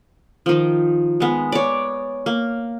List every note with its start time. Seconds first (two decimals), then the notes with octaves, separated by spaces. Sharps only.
0.46 D#3 F3
1.20 G#3 B3
1.52 C#5 D5
2.26 A#3